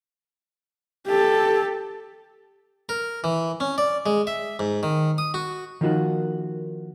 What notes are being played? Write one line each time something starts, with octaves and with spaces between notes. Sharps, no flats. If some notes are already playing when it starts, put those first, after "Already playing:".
G4 A4
A#4
E3
C#4
D5
G#3
E5
G#2
D#3
D#6
F#4
D#3 F3 A#3 D#4 F4 F#4